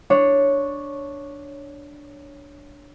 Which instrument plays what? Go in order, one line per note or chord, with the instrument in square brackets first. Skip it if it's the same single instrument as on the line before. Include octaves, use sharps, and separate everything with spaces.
[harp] D4 C#5